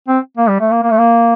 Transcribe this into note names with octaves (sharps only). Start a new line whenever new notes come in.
C4
A#3
G3
A3
A#3
A#3
A3
A#3